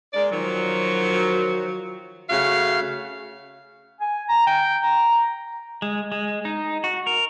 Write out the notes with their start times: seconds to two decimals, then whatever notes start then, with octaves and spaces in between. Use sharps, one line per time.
0.14 G#3 A#4 D5
0.31 D#3 F3 F#3
2.30 C#3 A3 F#4 F5
4.01 G#5
4.29 A#5
4.47 G5
4.83 A#5
5.82 G#3
6.12 G#3
6.45 D#4
6.84 F#4
7.07 A#4